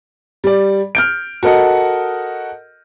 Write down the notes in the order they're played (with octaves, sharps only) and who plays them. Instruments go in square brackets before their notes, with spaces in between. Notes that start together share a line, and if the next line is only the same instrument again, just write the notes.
[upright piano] G3 D5
F6 G6 D7
F#4 A4 A#4 D#5 F#5